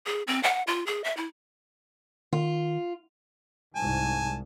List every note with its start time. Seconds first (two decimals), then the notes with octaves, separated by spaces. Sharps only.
0.06 G#4
0.27 C4
0.43 F#5
0.67 F4
0.86 G#4
1.04 E5
1.17 E4
2.33 D#3 F4
3.76 C2 G#2 G#5 A5